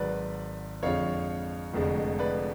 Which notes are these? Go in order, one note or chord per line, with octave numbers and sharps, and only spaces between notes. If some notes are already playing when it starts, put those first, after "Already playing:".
Already playing: G#1 G#2 F#3 B4 D5
F2 D3 F3 G#3 C#5 F5
F1 F2 D3 F3 G#3
B4 D5